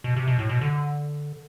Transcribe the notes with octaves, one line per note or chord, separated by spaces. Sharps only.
B2
C3
B2
A2
B2
D3